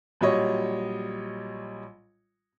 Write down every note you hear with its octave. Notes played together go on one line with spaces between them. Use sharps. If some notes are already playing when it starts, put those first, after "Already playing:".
A#1 F#3 G3 C#5 D#5 C#6